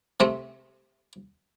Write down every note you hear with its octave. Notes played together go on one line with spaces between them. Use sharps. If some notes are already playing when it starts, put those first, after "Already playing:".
C3 A3 C4